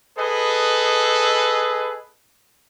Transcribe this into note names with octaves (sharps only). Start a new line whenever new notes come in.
G#4 A4 B4 D#5